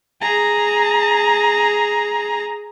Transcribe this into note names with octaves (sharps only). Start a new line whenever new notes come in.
G#4 A#5